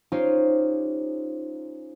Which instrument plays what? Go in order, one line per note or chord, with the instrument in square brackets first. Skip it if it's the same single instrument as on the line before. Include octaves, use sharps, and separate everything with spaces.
[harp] C#4 D#4 F4 G4 C5